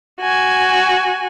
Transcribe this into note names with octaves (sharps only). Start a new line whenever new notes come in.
F#4 G#5